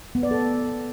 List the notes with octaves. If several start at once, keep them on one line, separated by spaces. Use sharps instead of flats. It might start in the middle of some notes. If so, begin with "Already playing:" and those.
B3
D5
A4